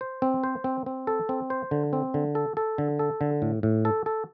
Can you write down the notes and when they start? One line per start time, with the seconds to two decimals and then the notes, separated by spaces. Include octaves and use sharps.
0.01 C5
0.22 C4
0.44 C5
0.64 C4
0.86 C4
1.07 A4
1.29 C4
1.50 C5
1.71 D3
1.93 C4
2.14 D3
2.35 A4
2.57 A4
2.78 D3
2.99 A4
3.21 D3
3.42 A2
3.63 A2
3.85 A4
4.06 A4